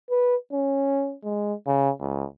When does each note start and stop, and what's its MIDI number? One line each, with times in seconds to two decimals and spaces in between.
0.10 0.36 71
0.53 1.15 61
1.24 1.53 56
1.67 1.90 49
2.00 2.24 37